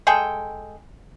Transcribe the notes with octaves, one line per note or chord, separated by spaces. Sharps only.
G#3 G#4 A4 G5